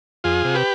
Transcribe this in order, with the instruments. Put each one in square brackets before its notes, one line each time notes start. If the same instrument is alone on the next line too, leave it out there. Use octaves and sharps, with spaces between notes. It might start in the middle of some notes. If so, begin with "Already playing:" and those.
[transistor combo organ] F2 F4 G#4
C3
G4 B4